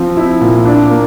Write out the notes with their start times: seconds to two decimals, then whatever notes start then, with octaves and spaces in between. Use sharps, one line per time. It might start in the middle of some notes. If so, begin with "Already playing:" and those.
Already playing: F3 C4
0.17 E4
0.41 A#2
0.65 D4
0.90 A#3